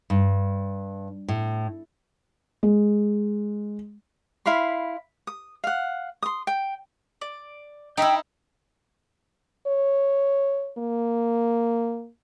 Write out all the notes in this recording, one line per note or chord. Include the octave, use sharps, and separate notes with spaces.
G2
A2
G#3
E4 F5 B5 C6
D#6
F5 F#5
C6 D#6
G5
D5
D#4 E4 G5 B5 E6
C#5
A#3